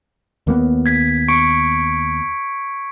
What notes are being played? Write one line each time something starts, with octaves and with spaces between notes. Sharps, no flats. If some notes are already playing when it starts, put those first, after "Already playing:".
D#2 A#3 B3
G#6 B6
C#6 C#7 D7